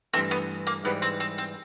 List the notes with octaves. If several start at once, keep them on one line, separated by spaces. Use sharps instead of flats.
G2 E3 A3 C4
B3
A#3
G#2 E3 G3 B3
C4
C4
C4